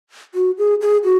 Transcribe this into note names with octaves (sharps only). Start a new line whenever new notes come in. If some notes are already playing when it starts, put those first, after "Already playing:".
F#4
G#4
G#4
F#4